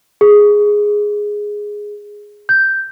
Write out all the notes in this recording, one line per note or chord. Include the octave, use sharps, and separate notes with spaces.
G#4
G6